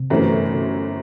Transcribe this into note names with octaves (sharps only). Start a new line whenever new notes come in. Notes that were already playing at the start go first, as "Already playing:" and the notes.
Already playing: C3
G1 F#2 E3 A3 C4